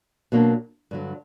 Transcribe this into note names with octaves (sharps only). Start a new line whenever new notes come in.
B2 F#3 A#3 D4
G2 D3 F#3